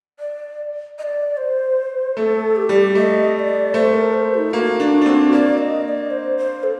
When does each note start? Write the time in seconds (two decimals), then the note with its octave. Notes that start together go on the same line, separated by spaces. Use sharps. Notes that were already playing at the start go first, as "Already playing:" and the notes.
0.19 D5
0.99 D#5
1.03 D5
1.37 C5
2.17 A3 A4
2.56 G4
2.69 G3
2.95 A3 D#5
3.34 D#5
3.39 D5
3.74 A3 C5
3.94 A#4
4.13 C5
4.34 F#4
4.38 D#4
4.53 A#3 F#4
4.80 D4
5.01 D4
5.06 C4
5.32 A#3 D5
5.58 D#5
5.85 D#5
5.88 D5
6.10 C5
6.38 C5
6.64 A4